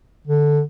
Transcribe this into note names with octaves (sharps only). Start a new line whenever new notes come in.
D3